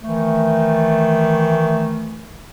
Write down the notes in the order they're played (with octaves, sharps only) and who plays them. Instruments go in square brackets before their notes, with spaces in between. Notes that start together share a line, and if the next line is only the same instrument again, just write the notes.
[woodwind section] D#3 E3 A3